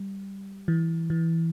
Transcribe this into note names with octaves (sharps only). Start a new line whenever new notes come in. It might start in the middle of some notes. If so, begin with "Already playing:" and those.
Already playing: G3
E3
E3